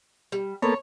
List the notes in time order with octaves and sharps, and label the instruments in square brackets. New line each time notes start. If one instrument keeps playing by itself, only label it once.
[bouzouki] G3
[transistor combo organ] A#3 B3 A4 [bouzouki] C#5